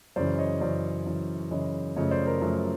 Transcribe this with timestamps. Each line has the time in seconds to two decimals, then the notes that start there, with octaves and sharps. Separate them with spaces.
0.16 F#2 C#3 E3 C5 D5
0.39 C#5 D#5
0.61 F#2 C#3 E3 C5 D5
1.06 F#2 C#3 E3
1.51 F#2 C#3 E3 C#5 D#5
1.96 F#2 C#3 F3 A3 C#5 D#5
2.11 C5 D5
2.26 A#4 C5
2.41 F#2 C#3 F3 A3